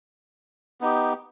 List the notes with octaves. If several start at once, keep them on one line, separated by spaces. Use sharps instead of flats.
B3 D#4 G4